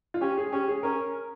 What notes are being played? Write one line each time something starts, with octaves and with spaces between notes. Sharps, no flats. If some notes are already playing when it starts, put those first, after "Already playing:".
F4
C#4 G4
G#4
C#4 G4
G#4
C#4 A#4